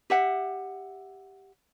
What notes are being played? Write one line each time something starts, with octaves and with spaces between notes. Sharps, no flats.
G4 E5 F#5